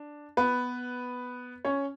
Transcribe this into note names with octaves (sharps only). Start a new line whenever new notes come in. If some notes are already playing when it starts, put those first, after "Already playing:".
Already playing: D4
B3 B4
C#4 C#5